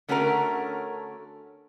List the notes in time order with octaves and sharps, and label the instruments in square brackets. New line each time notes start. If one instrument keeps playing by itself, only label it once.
[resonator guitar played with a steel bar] D3 A3 C#4 F#4 A4 A#4